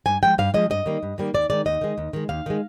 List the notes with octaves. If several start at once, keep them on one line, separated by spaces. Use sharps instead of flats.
G2 G#5
F3 G#3 G5
G2 F5
F3 G#3 D#5
G2 D#5
D#3 G3 A#3
G2
D#3 G3 A#3
D#2 D5
D#3 G#3 D5
D#2 D#5
D#3 G#3
D#2
D#3 G#3
D#2 F5
D#3 G#3